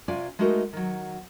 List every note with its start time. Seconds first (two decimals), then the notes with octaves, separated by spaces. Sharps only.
0.08 C3 C#4 F4 D5 G#5
0.39 G#3 A3 D#4 F#4 A#4
0.73 D#3 F#3